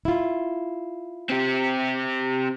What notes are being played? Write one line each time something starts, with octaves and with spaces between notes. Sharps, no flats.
E4 F4
C4 G4